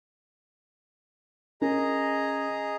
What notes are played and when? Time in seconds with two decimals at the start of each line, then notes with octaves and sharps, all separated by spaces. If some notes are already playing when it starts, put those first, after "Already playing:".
1.62 C#4 G#4 A#4 D#5 A#5